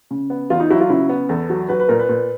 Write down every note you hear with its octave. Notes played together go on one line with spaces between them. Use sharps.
C#3
B3
E2 F4
D#4
F#3 E4
F4
C#3 E4
B3
E2 A4
F#3
F#3 B4
B4
A#2 A#4
B4
A#2